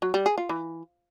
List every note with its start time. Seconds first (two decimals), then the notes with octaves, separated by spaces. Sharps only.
0.02 F#3
0.14 G3
0.26 G#4
0.38 F4
0.49 E3